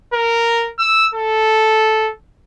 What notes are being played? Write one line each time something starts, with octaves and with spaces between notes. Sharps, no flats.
A#4
E6
A4